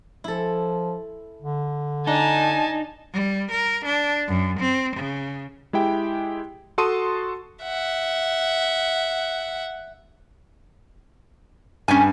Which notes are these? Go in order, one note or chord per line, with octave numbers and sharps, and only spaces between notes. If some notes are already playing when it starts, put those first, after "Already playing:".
F3 E4 A4
D3
D4 D#4 G#5 A5
G3
A#4
D4
F#2
C4
C#3
G#3 E4 G4 G5
F#4 A4 A5 C6 D#6 D#7
E5 F#5
G2 C#4 G#5